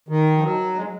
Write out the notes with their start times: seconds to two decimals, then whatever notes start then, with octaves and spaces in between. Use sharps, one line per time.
0.09 D#3
0.37 F3
0.42 F#3
0.76 G#3